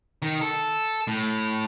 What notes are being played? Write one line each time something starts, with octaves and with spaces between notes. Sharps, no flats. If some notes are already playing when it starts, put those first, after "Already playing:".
D#3
A4
A2